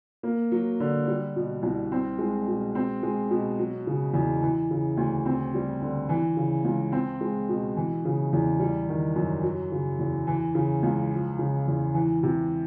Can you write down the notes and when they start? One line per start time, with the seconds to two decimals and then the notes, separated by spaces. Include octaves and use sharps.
0.23 A#3
0.52 F#3
0.80 D3
1.07 G3
1.36 B2
1.63 C2
1.92 C4
2.18 G#3
2.48 B2
2.75 C4
3.03 G#3
3.30 B2
3.59 F#3
3.87 C#3
4.14 E2
4.42 E3
4.71 C#3
4.97 D2
5.26 C4
5.54 G3
5.82 D3
6.09 E3
6.37 C#3
6.65 C#2
6.92 C4
7.21 G#3
7.49 B2
7.77 E3
8.05 C#3
8.33 E2
8.60 G3
8.89 D#3
9.16 F#2
9.43 F#3
9.72 C#3
9.99 E2
10.27 E3
10.55 C#3
10.83 C#2
11.12 F3
11.39 C#3
11.67 E2
11.94 E3
12.23 C3